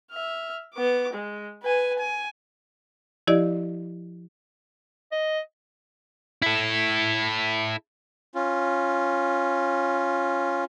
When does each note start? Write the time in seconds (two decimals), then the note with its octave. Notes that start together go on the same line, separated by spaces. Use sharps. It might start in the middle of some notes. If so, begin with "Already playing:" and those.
0.11 E5 F6
0.74 B3 D6
1.14 G#3
1.63 B4 G#5
1.99 G#5
3.27 F3 E4 G4 D5 D#5
5.12 D#5
6.42 E4 A4
8.35 C#4 F4